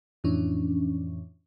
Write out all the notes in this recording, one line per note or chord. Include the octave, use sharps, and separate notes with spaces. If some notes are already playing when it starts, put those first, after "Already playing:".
F2 A2 E3 C#4 D4